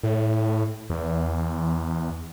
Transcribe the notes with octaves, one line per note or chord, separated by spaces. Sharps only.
A2
E2